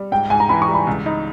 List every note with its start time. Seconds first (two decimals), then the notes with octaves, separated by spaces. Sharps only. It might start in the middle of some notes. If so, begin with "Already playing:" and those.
Already playing: G3
0.12 G#2 G5
0.30 G#2 G#5
0.40 A#5
0.49 E3 B5
0.62 C#6
0.68 G3
0.74 B5
0.87 C#2
1.06 D#4